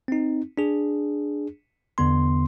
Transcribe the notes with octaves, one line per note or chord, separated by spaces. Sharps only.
C4 D#4
D4 G#4
E2 D3 B3 C6